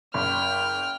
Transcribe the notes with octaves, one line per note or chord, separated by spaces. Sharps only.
F#1 G5 B5 F6